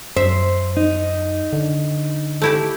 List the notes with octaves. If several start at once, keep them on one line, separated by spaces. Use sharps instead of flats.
F#2 C5 E5
D#4
D3
A3 E4 G4